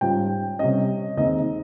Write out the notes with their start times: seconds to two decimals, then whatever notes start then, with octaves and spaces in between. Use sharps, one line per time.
0.01 G#2 G3 C#4 F4 G5
0.59 C3 G3 C#4 D#5
1.17 D#2 D#3 G#3 C4 D#4 D#5